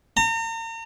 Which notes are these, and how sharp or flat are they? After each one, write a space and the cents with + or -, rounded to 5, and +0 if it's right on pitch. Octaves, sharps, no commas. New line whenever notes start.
A#5 -40